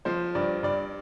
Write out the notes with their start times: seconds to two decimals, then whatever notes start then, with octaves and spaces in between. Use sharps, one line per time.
0.05 F3 C5
0.35 G2 D5
0.63 G2 D5